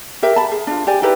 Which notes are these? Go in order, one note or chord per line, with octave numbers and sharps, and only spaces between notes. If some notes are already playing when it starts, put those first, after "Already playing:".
G4 A#4 E5
A5 B5
G#4
D4 F4
G4 D5 G#5
D#4 E4 G4 B4